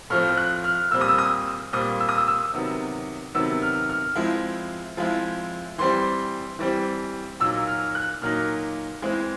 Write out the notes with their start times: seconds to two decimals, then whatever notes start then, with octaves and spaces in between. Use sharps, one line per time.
0.10 A2 F3 A3 C4 F6
0.37 F#6
0.64 F6
0.91 A#2 G3 C4 E6
1.01 D#6
1.09 E6
1.18 D#6
1.73 A#2 G3 C4 D#6
2.00 E6
2.09 D#6
2.17 E6
2.27 E6
2.54 C3 D#3 F#3 B3
3.35 C3 D#3 F#3 B3 E6
3.62 F6
3.89 F6
4.16 F3 G#3 C4 E4
4.97 F3 G#3 C4 E4
5.78 E3 G3 C4 C6
6.59 E3 G3 C4
7.40 A#2 F#3 A#3 D#4 E6
7.67 F6
7.95 F#6
8.22 A#2 F#3 A#3 D#4 F6
9.02 E3 G#3 C4 E4